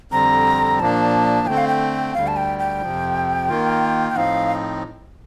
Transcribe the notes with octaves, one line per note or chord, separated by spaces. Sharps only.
F2 D3 G3 C4 A#5
A#2 F3 A#3 D4 A5
D3 A3 C4 G5
F5
G5
D2 D3 G3 F5
A5
G5
G5
F2 C3 F3
D#3 A#3 F4
G5
A2 F3 C4 D#4 F5